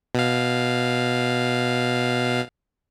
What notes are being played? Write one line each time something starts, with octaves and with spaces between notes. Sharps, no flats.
B2 F5